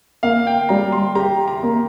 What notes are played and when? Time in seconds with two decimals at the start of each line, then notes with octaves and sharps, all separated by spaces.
0.23 A#3 F5
0.47 G5
0.69 G3 A#5
0.92 C6
1.15 G4 A#5
1.48 A#5
1.63 A#3